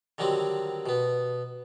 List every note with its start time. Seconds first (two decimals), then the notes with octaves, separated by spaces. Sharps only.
0.18 D3 D#3 F#3 G3 C4
0.86 B2 B3